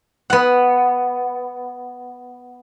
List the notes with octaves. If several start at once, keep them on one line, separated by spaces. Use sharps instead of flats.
B3 F#5